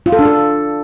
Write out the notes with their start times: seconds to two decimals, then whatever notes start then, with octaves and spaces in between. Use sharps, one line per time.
0.06 F4
0.12 A4
0.19 D4
0.25 A4